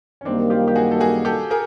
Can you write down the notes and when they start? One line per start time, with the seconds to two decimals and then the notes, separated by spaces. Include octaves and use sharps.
0.21 C#4
0.25 F#2 D#3 G3 A#3 C4 D4
0.50 F4 G4
0.68 G4
0.76 F#4 G#4
0.91 A4
1.00 F#4 G#4
1.25 G4 A4
1.50 G#4 A#4